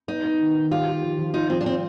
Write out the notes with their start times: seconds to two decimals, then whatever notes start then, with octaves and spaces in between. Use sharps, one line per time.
0.08 B3 D#4
0.24 B3
0.39 D#3
0.55 D#3
0.71 F4 G4
0.87 G4
1.02 F3
1.19 F3
1.34 D#4 F4
1.50 F3 C4
1.61 D4
1.66 C4